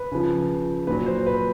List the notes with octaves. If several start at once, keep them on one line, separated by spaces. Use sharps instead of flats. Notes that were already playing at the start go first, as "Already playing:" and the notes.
Already playing: B4
C#3 F3
A#2 F#3 B4
C5
B4